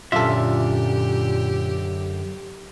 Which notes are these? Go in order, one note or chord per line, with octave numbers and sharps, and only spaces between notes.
F#2 A#2 D3 F4 G4 A4 E5